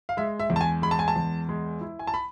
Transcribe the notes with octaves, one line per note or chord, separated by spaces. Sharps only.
F5
G#3 E5
E5
E2
A5
G#5
G#3 B5
A5
G#5
A5
E2
G#3
E4
G#5
A5
B5